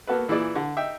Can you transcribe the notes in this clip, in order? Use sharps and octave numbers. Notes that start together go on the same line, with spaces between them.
A#3 B3 F#4 A4 B4
A#2 E3 E4 G#4 D5
D3
D#4 E5 G5